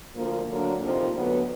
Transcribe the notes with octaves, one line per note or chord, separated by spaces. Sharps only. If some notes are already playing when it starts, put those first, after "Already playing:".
D2 D3 F3 A#3
D2 D3 F#3 A#3 D4
F2 C3 F3 A#3 D#4
D2 D3 F#3 B3